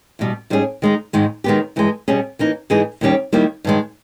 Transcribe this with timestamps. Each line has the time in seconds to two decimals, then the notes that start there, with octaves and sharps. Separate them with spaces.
0.19 E2 B2 G3
0.50 G#2 G3 C#4 G#4
0.82 D#3 G#3 D#4
1.13 G#2 D#3 G#3
1.44 D#3 G#3 B3 G4
1.76 G2 E3 G#3
2.08 B2 G3 C#4 G#4
2.39 E3 A#3 D#4
2.70 G#2 E3 G#3 D#4 G#4
3.01 D#2 D#3 G3 C#4 G4
3.32 D#3 G3 A#3 E4
3.64 G2 D#3 G#3